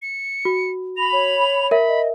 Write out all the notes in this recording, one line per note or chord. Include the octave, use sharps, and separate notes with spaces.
C#7
F#4
B5 A#6 F7
C#5
A#4 E5 B5
D#5